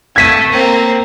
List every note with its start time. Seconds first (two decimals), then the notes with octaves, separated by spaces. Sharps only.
0.16 A3 G#6 B6 D#7
0.52 A#3 C4